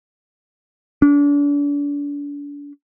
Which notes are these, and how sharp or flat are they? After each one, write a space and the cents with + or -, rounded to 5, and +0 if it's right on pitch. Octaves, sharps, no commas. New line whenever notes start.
D4 -35